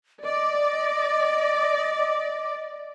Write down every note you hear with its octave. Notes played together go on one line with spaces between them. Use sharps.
D5 D#5